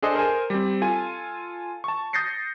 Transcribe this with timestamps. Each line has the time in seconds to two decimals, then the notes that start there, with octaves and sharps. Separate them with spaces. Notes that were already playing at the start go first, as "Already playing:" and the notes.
0.02 D4 G#4 A4 C5 D#5
0.15 A#4 C5 G#5
0.50 G3 C4
0.82 F4 A4 G#5
1.84 A5 C#6
2.13 D#6 G6 A6 A#6 C7 C#7